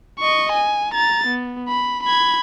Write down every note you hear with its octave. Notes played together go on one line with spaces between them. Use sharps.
D#5 C#6
G#5
A#5 A6
B3
B5
B5 G#6